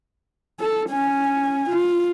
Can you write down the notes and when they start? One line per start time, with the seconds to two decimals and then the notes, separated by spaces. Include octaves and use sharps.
0.60 A4
0.89 C#4 G#5
1.69 F4